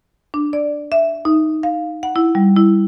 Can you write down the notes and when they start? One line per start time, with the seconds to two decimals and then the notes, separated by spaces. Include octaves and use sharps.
0.34 D4
0.53 D5
0.92 E5
1.25 D#4
1.63 F5
2.03 F#5
2.16 E4
2.35 G3
2.57 E4